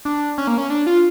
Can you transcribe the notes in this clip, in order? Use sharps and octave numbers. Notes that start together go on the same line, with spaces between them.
D4
C#4
A#3
C#4
D4
F4